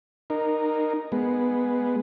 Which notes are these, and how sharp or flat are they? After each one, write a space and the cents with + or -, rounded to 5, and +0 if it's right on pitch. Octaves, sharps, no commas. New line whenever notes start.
D#4 -20 A#4 +0
G#3 +0 B3 +0